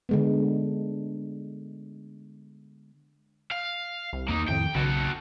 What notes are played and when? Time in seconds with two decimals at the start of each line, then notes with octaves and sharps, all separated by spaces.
0.09 D3 G#3 B3
3.52 F5
4.13 C2
4.29 E2 A#3 D#4
4.48 F2 A2 D#3 C4 G5
4.75 B1 C#3 F#4 A4